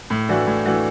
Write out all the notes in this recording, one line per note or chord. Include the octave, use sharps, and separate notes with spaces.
A2
E3 A3 D4 F#4
A2
E3 A3 D4 F#4